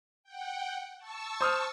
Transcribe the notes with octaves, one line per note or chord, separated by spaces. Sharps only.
F#5 G5
A5 C#6 E6
C5 D#6 F6